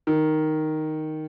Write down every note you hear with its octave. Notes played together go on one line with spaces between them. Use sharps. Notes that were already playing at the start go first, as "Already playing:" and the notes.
D#3